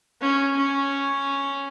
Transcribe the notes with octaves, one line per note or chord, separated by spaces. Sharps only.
C#4
C#4